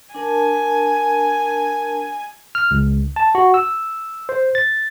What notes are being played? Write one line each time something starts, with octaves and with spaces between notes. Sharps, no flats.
D4 A#4 G#5 A5
F6
C#2
A5
F#4
E6
C5
A6